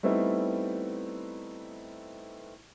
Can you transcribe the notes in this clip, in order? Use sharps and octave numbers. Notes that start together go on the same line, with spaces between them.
G3 A3 B3 C4 D#4 E4